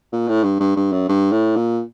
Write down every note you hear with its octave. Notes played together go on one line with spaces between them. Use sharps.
A#2
A2
G2
G2
G2
F#2
G2
A2
A#2